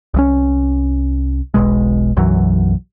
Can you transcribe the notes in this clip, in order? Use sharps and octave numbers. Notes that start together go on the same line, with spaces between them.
C2 E3 C#4
E1 B1 B2 G#3
B1 F#2 E3 F#3